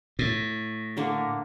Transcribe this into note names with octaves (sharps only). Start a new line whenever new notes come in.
A2
D3 A#3 D4